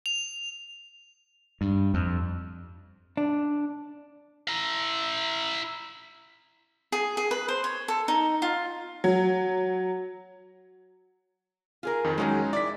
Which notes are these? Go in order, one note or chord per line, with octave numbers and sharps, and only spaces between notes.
F7
G2
F2
D4
E4 A#5
G#4
G#4
B4
C5
C#5
A4
D#4
F4
F#3
F4 G#4 A#4
F2 D#3
D#3 F#3 G#3 C#4 D#4 G#4
E4 D5 B6